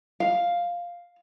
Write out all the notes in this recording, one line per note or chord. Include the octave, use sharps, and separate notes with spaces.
F5